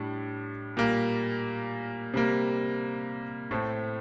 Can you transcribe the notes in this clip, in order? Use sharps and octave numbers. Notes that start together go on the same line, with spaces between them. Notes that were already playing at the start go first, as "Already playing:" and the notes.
Already playing: A2 G3 D4
A#2 G3 A#3
C3 G3 A#3
A2 A3 C4